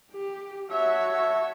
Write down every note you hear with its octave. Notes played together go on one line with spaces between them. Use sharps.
G4
F#4 A4 C#5 E5